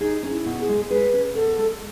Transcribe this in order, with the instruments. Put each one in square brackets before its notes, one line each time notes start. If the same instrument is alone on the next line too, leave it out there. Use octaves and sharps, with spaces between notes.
[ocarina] D#4 [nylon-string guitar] G#4
[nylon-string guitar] C#4
[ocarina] E4
[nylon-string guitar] B2
[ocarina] G#4
[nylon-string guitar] G#3
[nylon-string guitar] G#4 [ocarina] B4
[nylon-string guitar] C#4
[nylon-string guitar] B2 [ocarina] A4
[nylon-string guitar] G#3